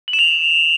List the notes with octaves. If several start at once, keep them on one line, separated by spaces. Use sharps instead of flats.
F#7
E7
F7